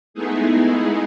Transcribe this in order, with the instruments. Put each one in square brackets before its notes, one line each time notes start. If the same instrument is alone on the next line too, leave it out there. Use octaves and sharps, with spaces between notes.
[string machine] G#3 A3 B3 D#4 E4 G#4